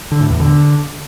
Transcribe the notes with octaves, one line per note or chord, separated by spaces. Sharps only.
D3
A2
E2
D3